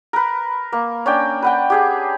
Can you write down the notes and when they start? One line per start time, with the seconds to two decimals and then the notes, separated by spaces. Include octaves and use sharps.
0.13 A#4 B4
0.72 A#3
1.06 C#4 D4 G5
1.42 B4 F#5 G5
1.70 G4 G#4 G5